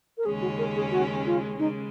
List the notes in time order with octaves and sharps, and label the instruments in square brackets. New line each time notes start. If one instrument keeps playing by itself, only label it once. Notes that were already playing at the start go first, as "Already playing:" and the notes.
[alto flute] A#4
[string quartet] D#2 C#3 G#3 C#4 [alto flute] G#4
[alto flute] F#4
A#4
G#4
F#4
F4
[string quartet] C#3 G#3 [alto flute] D#4